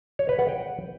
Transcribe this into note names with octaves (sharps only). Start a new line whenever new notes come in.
C#5
B4
F#5
G5